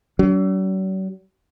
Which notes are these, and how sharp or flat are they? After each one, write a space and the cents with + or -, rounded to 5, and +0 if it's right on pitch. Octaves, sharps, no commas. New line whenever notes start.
F#3 +45 D4 -45